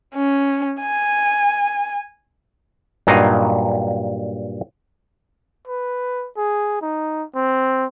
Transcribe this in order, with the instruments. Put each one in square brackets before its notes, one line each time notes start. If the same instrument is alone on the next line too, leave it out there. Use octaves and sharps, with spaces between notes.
[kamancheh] C#4
G#5
[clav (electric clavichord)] G2 A#2 F#3 D#4 D#5 F5
[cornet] B4
G#4
D#4
C4